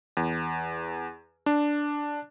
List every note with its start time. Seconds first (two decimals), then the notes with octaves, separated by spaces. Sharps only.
0.17 E2
1.46 D4